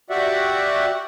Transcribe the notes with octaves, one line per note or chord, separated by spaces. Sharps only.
F#4 G4 D5 E5 F#5